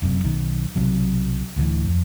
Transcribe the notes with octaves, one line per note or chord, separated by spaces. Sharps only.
E1 F#2 C3
B1 D#3
B1 C3 F#3
D1 D2 D#3 E3
F2